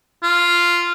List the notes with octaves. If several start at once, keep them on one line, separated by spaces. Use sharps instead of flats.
F4